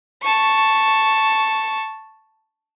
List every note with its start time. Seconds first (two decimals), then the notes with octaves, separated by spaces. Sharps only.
0.22 A5 C#6